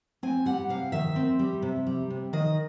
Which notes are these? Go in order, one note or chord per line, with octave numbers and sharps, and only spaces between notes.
C4 G#5
G3 F#5
C3 F5
D#3 E5
C4
G3
C3
G3
C3
D#3 D#5